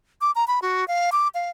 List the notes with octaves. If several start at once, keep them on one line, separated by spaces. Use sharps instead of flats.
D6
A#5
B5
F#4
F5
D6
F5